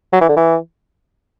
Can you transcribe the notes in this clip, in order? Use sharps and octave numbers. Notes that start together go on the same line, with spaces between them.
F#3
E3
D3
E3